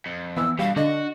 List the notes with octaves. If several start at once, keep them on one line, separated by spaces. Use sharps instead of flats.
F2
E3 B3 E6
G2 B2 G3 F5
D3 D4 F#4 D#5